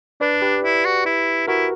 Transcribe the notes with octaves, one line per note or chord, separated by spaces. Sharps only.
D4 B4 D5
G4 B4
E4
F#4
E4
E4 F#4 A#4